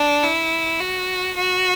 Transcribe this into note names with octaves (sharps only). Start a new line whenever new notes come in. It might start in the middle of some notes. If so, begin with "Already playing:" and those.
Already playing: D4
E4
F#4
F#4